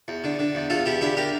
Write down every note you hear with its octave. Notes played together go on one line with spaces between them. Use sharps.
E2
D3
D3
E2
E2 F4 A4
E2 E4 G4
D3 E4 G4
G4 A#4